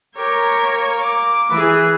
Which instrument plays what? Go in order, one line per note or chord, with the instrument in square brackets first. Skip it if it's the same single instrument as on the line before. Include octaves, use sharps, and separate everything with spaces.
[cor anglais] G4 [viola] A#4 C#5
[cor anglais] A#3
[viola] D6
[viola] E3 G#4 [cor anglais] B4